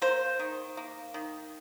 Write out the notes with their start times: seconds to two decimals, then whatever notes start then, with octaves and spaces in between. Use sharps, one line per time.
0.02 A#3 C5
0.39 D#3
0.77 A#3
1.14 D#3